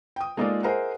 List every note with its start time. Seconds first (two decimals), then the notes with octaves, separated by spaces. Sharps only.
0.16 G5 D#6
0.37 G#3 A#3 D#4 F4 A4 D5
0.63 G#4 A#4 C5 D#5 E5 F#5